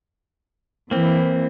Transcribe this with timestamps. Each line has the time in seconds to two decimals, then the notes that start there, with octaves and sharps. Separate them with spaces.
0.91 E3 A#3 C4